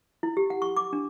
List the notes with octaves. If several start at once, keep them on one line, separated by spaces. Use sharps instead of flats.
E4
G4
F#5
C#6
D6
D4